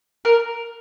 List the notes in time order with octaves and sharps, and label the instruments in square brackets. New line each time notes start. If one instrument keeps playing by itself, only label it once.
[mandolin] A#4